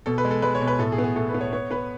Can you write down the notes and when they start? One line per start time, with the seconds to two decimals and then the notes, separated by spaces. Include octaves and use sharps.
0.06 B2 A4
0.18 B4
0.25 G#3
0.31 A4
0.42 G#3 B4
0.55 C#5
0.61 B2
0.68 B4
0.79 A2 A4
0.92 G#4
0.98 B3
1.04 G#4
1.16 A2 A4
1.29 B4
1.34 B3
1.41 C#5
1.53 B3 C#5
1.71 B3 B4